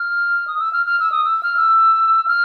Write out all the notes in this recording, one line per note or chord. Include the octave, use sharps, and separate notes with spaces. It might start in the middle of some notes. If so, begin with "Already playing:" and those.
Already playing: F6
D#6
E6
F6
F6
E6
D#6
E6
F6
E6
F6